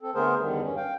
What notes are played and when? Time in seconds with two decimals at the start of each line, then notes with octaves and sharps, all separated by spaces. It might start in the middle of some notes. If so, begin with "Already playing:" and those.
0.01 C4 A4
0.15 D3 A3 B3 G#4 A#4 C5
0.40 E2 D3 D#3 G3
0.63 G2 C#4
0.77 F5 G5